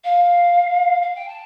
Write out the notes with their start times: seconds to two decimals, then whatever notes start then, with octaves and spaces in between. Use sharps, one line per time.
0.04 F5
1.02 F5
1.15 G5
1.28 A5